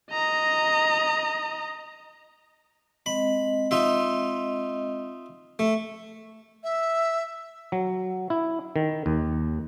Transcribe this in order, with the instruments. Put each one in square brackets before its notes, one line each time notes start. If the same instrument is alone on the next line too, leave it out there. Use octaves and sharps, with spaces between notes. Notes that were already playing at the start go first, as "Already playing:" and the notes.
[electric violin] D#5 A#5
[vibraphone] G#3 C4 D#5 [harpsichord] B5
[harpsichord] D#4 F4 E5
A3
[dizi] E5
[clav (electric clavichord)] F#3
E4
D#3
D#2